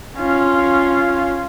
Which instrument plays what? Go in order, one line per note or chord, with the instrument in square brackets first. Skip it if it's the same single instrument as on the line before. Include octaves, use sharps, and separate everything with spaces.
[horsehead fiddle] C#4 F4